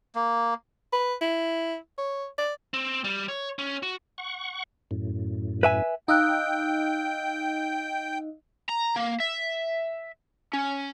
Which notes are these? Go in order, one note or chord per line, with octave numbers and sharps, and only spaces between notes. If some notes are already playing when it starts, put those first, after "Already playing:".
A#3
B4
E4
C#5
D5
C4
G3
C#5
C#4
F#4
F#5 C#6
F#2 A2
B4 E5 G#5
D#4 D#5 F5 G5 E6 F#6
A#5
A#3
E5
C#4